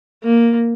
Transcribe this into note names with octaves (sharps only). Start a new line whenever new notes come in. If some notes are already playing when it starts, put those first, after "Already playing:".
A#3